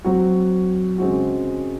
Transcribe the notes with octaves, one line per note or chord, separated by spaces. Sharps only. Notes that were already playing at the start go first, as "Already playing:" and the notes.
F#3 C4 F#4
C#3 G#3 C4 F#4